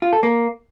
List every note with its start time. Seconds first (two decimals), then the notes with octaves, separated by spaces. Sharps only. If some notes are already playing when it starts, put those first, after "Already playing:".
0.02 F4
0.13 A4
0.23 A#3